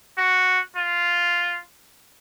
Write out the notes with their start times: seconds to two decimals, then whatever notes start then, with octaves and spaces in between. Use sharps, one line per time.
0.18 F#4
0.76 F4